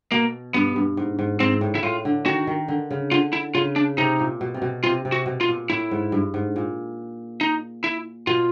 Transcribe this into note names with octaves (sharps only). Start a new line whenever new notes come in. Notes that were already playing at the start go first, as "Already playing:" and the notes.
B2 A#3
G2 B3
G2
G#2
G#2
G#2 C4
A2
E4
A2 F4
D3
D#3 F#4
D#3
D3
C#3
D3 F4
E4
C#3 F4
D4
C3 D#4
A#2
B2
C3
B2
C3 F4
C3
F#4
B2
F4
A#2
A2 E4
G#2
G2
G#2
A#2
D#4
E4
B2 F4